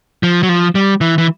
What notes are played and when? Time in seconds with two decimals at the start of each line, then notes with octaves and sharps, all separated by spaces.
0.23 F3
0.43 F#3
0.49 F3
0.75 G3
1.01 E3
1.18 E3